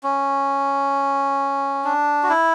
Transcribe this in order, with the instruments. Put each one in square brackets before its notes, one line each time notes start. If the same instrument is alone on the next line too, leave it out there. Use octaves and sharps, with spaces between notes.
[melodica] C#4
D4
F#4
E4